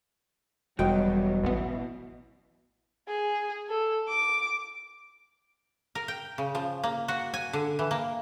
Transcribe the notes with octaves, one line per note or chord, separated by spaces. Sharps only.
E1 F#3 G3 F#4 D#5 G5
A1 B2 E3 B3
G#4
A4
D6
A#4
G5
C#3
F3
A#3
F#4
G#5
D3
E3
A#3